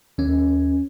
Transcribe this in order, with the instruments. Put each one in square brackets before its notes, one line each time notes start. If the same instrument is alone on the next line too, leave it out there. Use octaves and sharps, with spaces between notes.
[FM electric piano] D#2 C#4